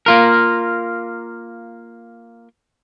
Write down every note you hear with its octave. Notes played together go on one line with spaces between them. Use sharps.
A#3 F4 A#4